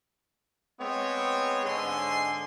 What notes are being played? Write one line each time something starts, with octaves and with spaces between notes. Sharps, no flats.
G#3 B3 C4 C#5
G#2 D3 G#3 G#5 C6